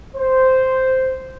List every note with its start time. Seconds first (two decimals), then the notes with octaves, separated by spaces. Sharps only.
0.16 C5